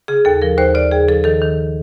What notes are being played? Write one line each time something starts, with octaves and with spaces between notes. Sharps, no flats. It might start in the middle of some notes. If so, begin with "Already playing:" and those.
C#3 G#4
D#2 A4
F3 A#4
D#2 C5
C#3 D5
D#2 G#4
F3 A4
D#3 A4
D#3